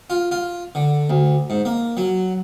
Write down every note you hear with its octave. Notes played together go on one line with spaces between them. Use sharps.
F4
F4
D3
D2
G#2
A#3
F#3